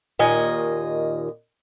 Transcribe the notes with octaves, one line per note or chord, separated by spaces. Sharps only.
D#2 A#2 D#3 D#5 G#5